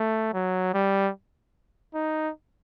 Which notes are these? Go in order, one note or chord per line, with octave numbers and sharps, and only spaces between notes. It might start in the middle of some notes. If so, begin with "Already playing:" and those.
Already playing: A3
F#3
G3
D#4